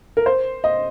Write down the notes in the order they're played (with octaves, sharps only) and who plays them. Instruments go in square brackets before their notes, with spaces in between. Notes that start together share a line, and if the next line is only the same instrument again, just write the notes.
[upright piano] A#4
C5
D#5